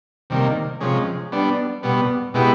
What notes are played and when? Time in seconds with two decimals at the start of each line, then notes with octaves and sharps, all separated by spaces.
0.30 C3 D#3 G3 A#3
0.81 C3 F3 G#3 C#4
1.32 G3 B3 D4
1.83 B2 G3 B3
2.34 B2 G#3 B3 E4 G4